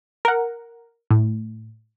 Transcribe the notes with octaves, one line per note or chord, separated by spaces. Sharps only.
A#4 F#5
A2